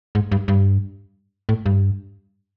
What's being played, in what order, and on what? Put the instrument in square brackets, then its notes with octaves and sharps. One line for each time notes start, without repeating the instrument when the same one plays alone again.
[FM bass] G#2
G2
G2
A2
G2